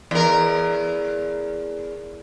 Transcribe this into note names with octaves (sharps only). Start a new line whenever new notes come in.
E2 A#4